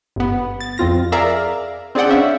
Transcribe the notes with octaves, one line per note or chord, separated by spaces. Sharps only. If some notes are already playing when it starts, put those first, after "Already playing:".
G1 B3
A6
F2 C4 F4 A#6
G#4 A#4 D5 E5 F5 A#5
C4 D4 G#4 D5 F#5 G5
C#4 E5 F5